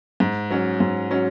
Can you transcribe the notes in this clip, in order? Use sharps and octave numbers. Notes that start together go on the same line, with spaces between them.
G#2
F#3 C#4
G#2
F#3 C#4